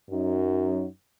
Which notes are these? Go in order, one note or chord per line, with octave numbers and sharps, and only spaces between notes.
F#2 D#4